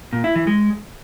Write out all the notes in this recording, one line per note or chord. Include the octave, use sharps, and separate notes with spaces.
A#2
E4
E3
G#3